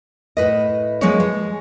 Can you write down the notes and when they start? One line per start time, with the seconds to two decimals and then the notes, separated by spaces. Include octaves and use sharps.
0.37 A2 B4 D#5
1.02 F3 G#3 A#3 G#4 B4 C#5
1.20 G#3